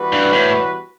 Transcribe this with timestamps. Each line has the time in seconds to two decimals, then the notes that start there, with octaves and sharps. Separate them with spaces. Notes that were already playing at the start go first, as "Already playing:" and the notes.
Already playing: E3 G3 B3 F#4 B4
0.12 G2
0.33 A2